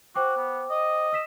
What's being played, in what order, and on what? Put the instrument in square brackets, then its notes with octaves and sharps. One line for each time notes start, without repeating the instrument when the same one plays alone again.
[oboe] F#4 [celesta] C5 G5 D6
[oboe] B3
D#5
[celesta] E6 B6 E7